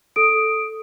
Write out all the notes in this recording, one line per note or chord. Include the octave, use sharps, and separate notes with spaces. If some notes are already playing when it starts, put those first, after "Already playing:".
A4 D#6 D7